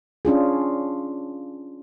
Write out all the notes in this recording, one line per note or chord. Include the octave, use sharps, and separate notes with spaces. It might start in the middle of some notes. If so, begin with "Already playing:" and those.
C#4 D4 F4 G#4